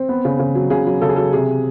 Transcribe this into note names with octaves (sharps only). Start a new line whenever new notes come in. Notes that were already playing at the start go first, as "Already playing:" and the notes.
Already playing: C4
B3
C#3
C#3
F#3
C#3 G#4
F#3
C#3 A4
G#4
F#3 A4
C3 G#4